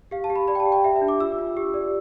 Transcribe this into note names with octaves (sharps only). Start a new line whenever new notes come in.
G4 F5
A5
G4
B5
D5 B5
G5
A5
G4
G5
G4 E5
E5
D4
D6
F4 E6
F4
G4
D5